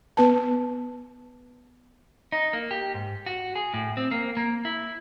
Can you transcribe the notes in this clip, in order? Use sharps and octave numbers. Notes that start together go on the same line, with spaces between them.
B3 B4 A5
D#4
A#3
G4
G#2
F#4
G#4
A2
C4
A#3
A#3
E4